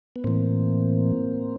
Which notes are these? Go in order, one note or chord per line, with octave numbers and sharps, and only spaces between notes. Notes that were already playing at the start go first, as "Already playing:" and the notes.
B3
A2 E3 A#3 C4